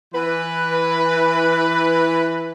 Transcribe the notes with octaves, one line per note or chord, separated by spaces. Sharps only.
E3 B4